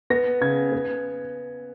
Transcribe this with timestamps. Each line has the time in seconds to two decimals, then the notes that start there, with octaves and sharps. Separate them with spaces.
0.10 B3 A#6
0.41 C#3 G#6
0.72 B3